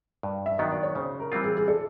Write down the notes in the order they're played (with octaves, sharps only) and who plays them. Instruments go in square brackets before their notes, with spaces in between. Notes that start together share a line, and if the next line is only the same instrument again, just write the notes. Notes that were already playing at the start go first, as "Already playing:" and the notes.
[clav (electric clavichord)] G2
[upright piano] E5
[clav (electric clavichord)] D#3 F#3 B3 D4 [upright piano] D#5
[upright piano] D5
C#5
[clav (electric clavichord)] C#3 [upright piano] C5
[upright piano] A#4
[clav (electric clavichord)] E3 G3 C4 F4
[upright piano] G#4
G#4
A4